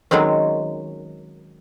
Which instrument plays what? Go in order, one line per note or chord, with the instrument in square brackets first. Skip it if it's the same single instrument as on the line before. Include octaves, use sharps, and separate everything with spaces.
[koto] D#3 F#3 G#3 C4 C#4